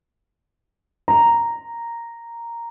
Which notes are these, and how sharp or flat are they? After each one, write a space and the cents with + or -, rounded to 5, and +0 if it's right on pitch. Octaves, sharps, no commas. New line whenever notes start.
A#5 -5